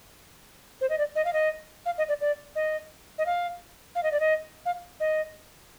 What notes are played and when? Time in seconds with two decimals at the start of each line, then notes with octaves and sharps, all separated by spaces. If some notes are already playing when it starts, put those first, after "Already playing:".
0.81 C5
0.90 D#5
0.98 D5
1.16 D#5
1.25 F5
1.33 D#5
1.86 F5
1.98 D#5
2.09 D5
2.21 D5
2.56 D#5
3.18 D#5
3.26 F5
3.95 F5
4.03 D#5
4.12 D5
4.20 D#5
4.66 F5
5.00 D#5